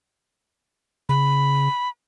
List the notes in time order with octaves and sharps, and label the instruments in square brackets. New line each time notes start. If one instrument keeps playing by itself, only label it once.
[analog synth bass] C#3 [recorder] B5